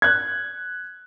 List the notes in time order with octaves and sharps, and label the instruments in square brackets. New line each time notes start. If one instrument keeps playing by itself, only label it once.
[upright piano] F#6 G#6